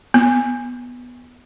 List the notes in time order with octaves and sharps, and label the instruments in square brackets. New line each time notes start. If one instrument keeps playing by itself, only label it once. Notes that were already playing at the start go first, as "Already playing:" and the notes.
[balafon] B3